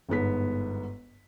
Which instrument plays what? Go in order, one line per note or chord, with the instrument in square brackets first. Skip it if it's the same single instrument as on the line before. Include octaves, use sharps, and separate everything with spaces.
[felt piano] G1 G#2 B3 B6